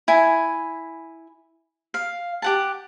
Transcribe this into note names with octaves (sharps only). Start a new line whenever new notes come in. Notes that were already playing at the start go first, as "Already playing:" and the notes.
E4 G#5
F5
G4 F#5 A5